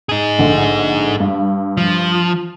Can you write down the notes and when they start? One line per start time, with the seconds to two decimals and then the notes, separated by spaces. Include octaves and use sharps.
0.09 D#4 G#4
0.38 A#1 D3 A3
1.20 G2
1.77 F3